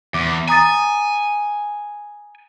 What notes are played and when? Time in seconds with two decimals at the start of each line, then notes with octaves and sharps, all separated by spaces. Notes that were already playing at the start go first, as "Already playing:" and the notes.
0.14 E2 D6
0.48 G#5 A#5 D#6 A6